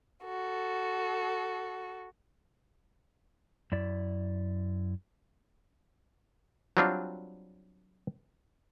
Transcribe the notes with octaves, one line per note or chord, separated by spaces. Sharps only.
F#4 A4
F#2 E4 D5
F#3 G3 C4 D4 F4